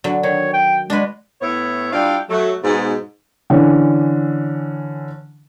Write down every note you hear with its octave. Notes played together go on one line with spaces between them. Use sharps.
D3 F#3
D#3 C#5
G5
G#3 D4 F#4 B4
A2 B3 E4 C#5
G3 D4 E4 F4 F5 G5
F#3 A3
G#2 B2
D3 E3 C#4